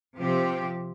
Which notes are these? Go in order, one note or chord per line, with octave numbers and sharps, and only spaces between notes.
C3 F3 C4 G4